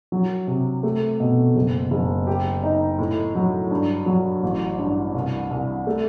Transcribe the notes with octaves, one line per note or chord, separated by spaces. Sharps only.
F#3
C3
A3
B2
F#1
F#1
G4
D#4
A2
F#3
G2
F#3
A1
G2
C2
C2
A3